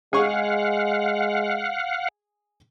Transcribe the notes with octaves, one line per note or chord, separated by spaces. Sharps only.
G#3 G#4 F5 F#5 G#5 C#6